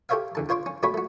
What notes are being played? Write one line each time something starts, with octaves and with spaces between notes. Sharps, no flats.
G4 A4 C5 C#5 E5 F5
E2 D3 A5
F4 C5 C#5 C6 D6
C#4
B2 A3 C#4 F#4 C#5 B5
A3 F#4